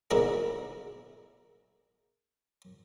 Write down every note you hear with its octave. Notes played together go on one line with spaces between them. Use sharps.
B2 D3 A#3 D#4 E4 G#4